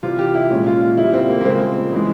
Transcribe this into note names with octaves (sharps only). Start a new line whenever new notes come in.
C3 E3 G3 F4
G4
E4
A#2 G#3 C#4
F4
F4
C#3 E4
G3
C4
A#3
A#3
C#3 F3 G#3 C4
C#3 E3 G#3